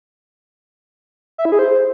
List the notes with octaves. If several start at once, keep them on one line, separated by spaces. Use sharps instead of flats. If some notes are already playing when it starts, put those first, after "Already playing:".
E5
E4
G#4
C5